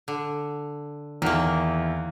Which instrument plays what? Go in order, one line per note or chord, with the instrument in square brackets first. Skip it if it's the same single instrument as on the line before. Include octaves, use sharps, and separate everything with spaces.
[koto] D3
[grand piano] E2 E4 [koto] D#3 A#3